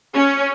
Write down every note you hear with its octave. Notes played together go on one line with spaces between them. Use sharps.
C#4